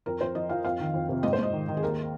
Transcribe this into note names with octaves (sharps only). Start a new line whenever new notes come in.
F2 A#4
F2 C5
F3 D#5
F3 F5
F2 F5
D#3
F2
C3
G#2 D#5
C5
G#2 D#5
D#3
D#3
G#4
D#2 A#4